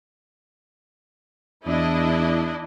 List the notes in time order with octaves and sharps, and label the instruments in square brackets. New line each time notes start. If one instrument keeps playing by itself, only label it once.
[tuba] E2 [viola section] D4 E4 D#5